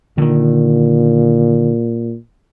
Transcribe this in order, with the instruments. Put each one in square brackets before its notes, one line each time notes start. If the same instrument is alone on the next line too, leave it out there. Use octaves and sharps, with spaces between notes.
[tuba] A#2 [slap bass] D3 D#3